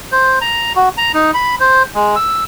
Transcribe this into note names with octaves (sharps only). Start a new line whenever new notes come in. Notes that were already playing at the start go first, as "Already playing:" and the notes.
C5
A#5
F#4
A#5
D#4
B5
C5
G#3
E6